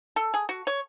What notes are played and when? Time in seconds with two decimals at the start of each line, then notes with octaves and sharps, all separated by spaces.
0.16 A4
0.34 G#4
0.49 F#4
0.67 C#5